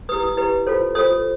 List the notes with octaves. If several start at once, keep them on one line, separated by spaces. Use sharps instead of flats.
E4 G4 B4 D#6
D#6
E4 G4 B4
F4 A4 C5
F4 A4 C5 D#6